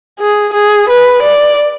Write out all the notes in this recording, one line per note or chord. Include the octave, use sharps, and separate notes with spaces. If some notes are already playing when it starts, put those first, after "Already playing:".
G#4
G#4
B4
D5